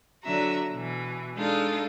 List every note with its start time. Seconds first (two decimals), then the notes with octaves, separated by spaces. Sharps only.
0.24 D3 F#3 F#4 E5 A#5
0.71 B2 E3
1.35 G#3 D4 D#4 F4 A4